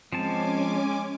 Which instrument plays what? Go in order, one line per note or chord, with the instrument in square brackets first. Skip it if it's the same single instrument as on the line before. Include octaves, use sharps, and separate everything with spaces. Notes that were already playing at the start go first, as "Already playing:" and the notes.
[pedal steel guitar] F3 C4 A5 [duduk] G#3 [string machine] C#4 G#5 D6